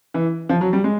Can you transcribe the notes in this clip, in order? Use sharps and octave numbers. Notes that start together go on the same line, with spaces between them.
E3
F3
F#3
G3
G#3